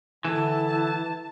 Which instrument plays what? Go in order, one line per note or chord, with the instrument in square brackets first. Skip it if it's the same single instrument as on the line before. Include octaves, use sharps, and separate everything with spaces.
[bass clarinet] D3 [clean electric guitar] E3 [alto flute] E4 [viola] A5